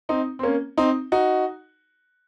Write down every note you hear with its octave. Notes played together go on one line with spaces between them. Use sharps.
C4 D#4
C4
A#3 C#4
C4 D#4
D#4 F#4